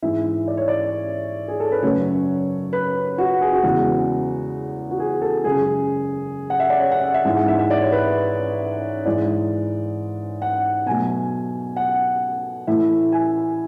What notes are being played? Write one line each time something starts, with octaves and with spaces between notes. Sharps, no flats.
G#2 E3 G#3 E5
D5
C#5
D5
G#4
A4
B4
F#2 C#3 F#3 A3 C#5
B4
F#4
G#4
F#4
E2 C#3 G#3 F#4
F#4
G#4
A4
F#2 C#3 G#3 G#4
F#5
E5
D5
C#5
F#5
E5
E5
G#2 E3 G#3
F#5
E5
E5
D5
C#5
B4
G#2 E3 G#3 D5
F#5
B2 F#3 A3 G#5
F#5
A2 E3 A3 E5
G#5